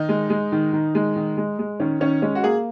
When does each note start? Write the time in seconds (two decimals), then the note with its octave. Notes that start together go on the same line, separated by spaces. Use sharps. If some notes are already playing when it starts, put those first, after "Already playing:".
Already playing: D#3 D#4
0.09 G#3
0.30 G#3
0.52 D#3
0.73 D#3
0.95 G#3
1.16 D#3
1.37 G#3
1.59 G#3
1.80 D#3 C#4
2.00 D#3 C#4
2.22 G#3 C#4
2.35 F#4
2.43 A#3 G#4